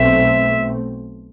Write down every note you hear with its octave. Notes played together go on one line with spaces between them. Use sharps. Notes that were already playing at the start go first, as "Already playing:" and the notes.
Already playing: B1 B2 A3 C4 E5